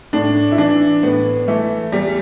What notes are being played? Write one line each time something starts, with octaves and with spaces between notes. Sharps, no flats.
A2 D4
E4
E3 D4
A2 B3
E3 A3
E2 G3